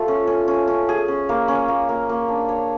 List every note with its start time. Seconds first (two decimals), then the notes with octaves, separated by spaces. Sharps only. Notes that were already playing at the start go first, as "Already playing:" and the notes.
Already playing: A3 F4 A4
0.08 C#4
0.27 C#4
0.48 C#4
0.68 C#4
0.89 G#4
1.08 C#4
1.29 A#3
1.48 C#4
1.68 A#3
1.89 A#3
2.09 A#3
2.28 D4
2.49 C#5